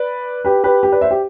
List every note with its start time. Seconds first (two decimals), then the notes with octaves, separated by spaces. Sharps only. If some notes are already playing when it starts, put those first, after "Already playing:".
Already playing: B4 D5
0.45 G4 B4
0.64 G4 B4
0.83 G4
0.92 B4 D5
1.01 C5 E5
1.11 G4